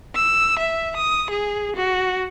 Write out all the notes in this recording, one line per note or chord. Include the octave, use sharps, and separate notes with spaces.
E6
E5
D#6
G#4
F#4